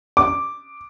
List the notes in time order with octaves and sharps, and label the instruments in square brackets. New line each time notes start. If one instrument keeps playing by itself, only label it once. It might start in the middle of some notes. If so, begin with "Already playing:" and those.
[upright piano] D6